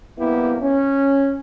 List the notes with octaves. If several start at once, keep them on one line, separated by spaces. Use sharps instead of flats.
C2 A#3 B3 E4 G4
C#4